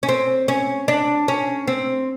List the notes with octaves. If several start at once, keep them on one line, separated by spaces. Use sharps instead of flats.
C#4
C4
C#4
D4
C#4
C4